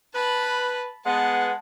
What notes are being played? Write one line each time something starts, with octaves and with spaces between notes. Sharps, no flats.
B4 A5 B5
G#3 B3 F#5 A5